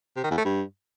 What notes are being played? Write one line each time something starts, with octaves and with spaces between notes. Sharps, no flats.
C3
D#3
E2
A3
G2